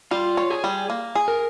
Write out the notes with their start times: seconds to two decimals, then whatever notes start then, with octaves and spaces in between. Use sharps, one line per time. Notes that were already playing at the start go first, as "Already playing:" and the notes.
0.11 G3 F4
0.37 C#5
0.50 G#4
0.64 G3
0.90 A#3
1.15 G#4
1.28 A#4